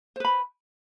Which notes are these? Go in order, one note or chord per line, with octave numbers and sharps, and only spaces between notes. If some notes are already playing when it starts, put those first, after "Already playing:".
B4 C5 B5